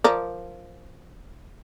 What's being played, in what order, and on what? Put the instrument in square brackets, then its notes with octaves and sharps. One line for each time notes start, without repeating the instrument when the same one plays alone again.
[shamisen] F3 A#4 D5